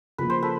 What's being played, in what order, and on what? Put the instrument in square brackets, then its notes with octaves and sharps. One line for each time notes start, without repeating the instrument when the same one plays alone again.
[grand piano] C#3 F3 A#3 [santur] B4
[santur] C5
A4 B4